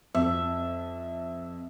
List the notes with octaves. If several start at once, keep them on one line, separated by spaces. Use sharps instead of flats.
F2 E5